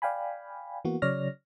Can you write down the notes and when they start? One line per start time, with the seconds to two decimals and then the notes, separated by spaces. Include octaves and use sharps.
0.02 D5 F5 G5 G#5 B5
0.85 E3 A#3 B3 F#4
1.02 C#3 F#3 C#5 D5 F6 A#6